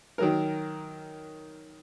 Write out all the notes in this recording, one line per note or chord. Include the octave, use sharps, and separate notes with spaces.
D#3 F#3 A#4